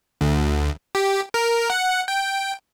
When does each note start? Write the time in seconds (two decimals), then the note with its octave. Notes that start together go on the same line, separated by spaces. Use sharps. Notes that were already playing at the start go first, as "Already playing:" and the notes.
0.21 D2
0.95 G4
1.34 A#4
1.70 F#5
2.08 G5